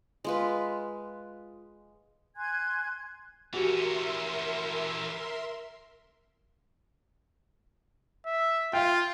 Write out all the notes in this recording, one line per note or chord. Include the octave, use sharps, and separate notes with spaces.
G#3 F4 B4
G#5 C6 F#6 G#6
E3 C#4 F#4 G4 A#4 E5 C6
E5
F4 F5 G5